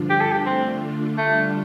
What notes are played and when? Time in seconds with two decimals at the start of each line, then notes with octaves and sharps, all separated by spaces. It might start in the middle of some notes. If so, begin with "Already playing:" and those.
Already playing: G2 D3 F3 D4 F4
0.10 G4
0.21 A4
0.32 G4
0.46 D3 A3 C4 D4 F4
1.17 D3 G3 A3 D4 F4